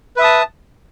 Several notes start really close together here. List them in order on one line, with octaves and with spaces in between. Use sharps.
B4 E5 D#6 A5